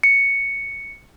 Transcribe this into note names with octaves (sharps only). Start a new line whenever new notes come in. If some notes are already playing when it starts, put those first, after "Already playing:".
C#7